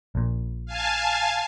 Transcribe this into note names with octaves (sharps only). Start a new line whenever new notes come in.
A#1 A#2
F5 G#5 A5